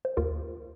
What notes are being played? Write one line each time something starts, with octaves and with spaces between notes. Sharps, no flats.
C5
D#2 F4 A#4